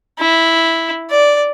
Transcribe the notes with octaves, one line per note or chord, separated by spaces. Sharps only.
E4
D5